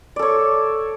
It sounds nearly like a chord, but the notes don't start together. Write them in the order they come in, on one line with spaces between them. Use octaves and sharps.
D5 A4 C#5